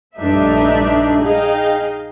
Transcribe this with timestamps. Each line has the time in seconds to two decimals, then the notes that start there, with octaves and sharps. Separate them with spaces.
0.17 A#1 G2 A3 D4 D#4 E5
1.21 D#4 G#4 D#5 F5 G5